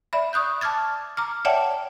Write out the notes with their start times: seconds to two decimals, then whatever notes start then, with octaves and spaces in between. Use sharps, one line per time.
0.13 D5 E5 B5
0.33 C#6 D#6 F#6 G6
0.61 A5 D6 F6 G#6 A6
1.17 A#5 D6 F6
1.45 C#5 D5 E5 F#5 G5 A5